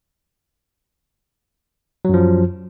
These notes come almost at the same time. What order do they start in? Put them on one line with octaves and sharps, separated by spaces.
F#3 F#2 F3